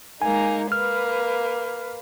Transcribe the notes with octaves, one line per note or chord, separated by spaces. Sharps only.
G#3 A#3 D#4 G#5
A#3 B4 F6